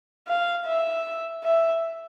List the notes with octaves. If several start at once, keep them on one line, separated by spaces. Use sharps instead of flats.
F5
E5
E5